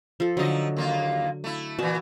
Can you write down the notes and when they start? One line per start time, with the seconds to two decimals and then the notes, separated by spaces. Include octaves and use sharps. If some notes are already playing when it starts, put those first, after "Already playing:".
0.20 F3 A4
0.37 D3 F3 F#3 D#4 D#5
0.77 D#2 A#3 F4
1.44 A3 E4
1.79 A#2 E3 F#4 A5